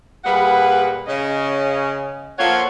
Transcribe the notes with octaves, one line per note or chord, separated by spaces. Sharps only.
A#2 G3 G#4 B4 F#5
C#3 C#4 D#5
F3 A#3 F4 A4 C#5 F#5